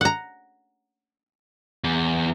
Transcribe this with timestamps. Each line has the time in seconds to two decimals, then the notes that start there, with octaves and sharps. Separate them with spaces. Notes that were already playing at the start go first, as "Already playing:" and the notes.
0.01 F#5 A#5
1.84 E2